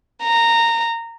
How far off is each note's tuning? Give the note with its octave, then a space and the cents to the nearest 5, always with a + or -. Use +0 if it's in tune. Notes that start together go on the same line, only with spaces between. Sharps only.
A#5 -15